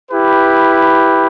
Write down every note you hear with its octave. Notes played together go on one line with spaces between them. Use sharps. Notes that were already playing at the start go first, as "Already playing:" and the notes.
E4 G4 B4